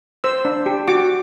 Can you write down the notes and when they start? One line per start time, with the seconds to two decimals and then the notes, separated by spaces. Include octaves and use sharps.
0.24 C5 E6
0.45 D4
0.66 G4
0.88 F#4 D6